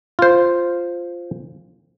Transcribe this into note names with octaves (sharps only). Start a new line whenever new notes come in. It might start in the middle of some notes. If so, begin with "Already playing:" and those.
F4 C5